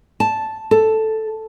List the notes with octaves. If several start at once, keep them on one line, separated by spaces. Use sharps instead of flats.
A5
A4